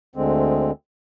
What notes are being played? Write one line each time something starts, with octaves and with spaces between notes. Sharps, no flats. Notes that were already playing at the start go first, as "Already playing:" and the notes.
D2 D3 G#3 C4